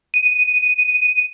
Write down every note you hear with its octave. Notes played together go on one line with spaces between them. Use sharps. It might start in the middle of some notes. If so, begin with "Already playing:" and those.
D#7